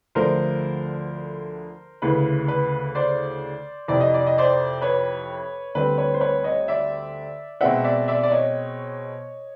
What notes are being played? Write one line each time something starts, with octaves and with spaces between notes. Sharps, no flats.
D2 D3 F3 A3 A#4 C5
D2 C#3 E3 B4
B4
C5 D5
F2 C3 E3 D5
D#5
D5
D#5
C5 D5
B4 C#5
D2 D3 G3 C4 B4
B4 C#5
C5
B4 C#5
C#5 D#5
D5 E5
B2 G#3 C4 E5 F#5
D5 E5
D5 E5
D5
C#5 D#5